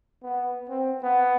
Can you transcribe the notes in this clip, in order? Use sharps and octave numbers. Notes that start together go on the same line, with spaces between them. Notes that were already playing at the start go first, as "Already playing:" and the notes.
B3
C4
B3